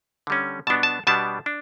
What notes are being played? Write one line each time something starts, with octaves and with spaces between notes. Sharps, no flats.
D3 G3 C#4
B2 G3 B3 D4 A5
A5
B2 G3 B3 D4 A5
D4